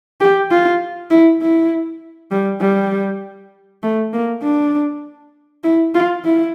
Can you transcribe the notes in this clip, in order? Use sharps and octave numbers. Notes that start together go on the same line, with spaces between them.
G4
F4
E4
E4
G3
G3
A3
A#3
D4
E4
F4
E4